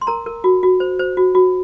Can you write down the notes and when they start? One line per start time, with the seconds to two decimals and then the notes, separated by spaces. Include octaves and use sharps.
0.01 C6
0.07 A#4 A#5
0.26 A#4
0.44 F#4
0.63 F#4
0.80 C5
0.99 C5
1.17 F#4
1.35 F#4